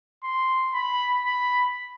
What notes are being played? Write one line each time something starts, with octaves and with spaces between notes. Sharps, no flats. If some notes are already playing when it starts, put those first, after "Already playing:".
C6
B5
B5